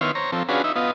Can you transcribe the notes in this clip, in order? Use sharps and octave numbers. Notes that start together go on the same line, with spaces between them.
D#3 B3 E4 C#5 C6 F6
C5 C#5 A#5
F3 C4 A4
C#4 D4 F4 F#4 G#4 B4
D#4 E5
B3 F4 D#5